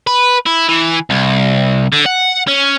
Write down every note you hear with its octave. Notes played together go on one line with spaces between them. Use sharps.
B4
E4
E3
C2
D3
F#5
C#4